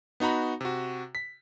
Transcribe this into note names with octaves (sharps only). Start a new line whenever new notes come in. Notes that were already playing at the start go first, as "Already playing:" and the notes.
B3 D#4 F#4 A#5 B5
C3 F#4
B6